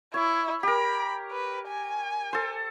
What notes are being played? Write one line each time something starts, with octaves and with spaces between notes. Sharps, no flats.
E4 C#5
G4 A#4 B5
B4
G#5
A4 C5